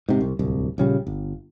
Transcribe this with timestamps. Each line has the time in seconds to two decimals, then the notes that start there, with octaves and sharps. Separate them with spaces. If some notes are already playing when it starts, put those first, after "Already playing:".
0.08 G#2 C3
0.21 C2
0.39 D1 C2
0.78 A#1 C#3 G3
1.07 G1